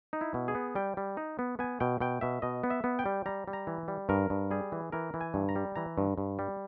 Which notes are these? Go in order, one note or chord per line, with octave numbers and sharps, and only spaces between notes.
D#4
E4
B2
G#4
B3
G3 G5
G3
D#4
B3
B3 G#5
B2 G5
B2 G5
B2 E5
B2 D#5
B3
E5
B3
G5
G3
G3 A#5
G3
A#5
E3
G3
G2 A#4
G2
G3 G#4
E3
E3 A#4
E3
G#5
G2
A#5
G3
E3 A#5
G2
G2
G3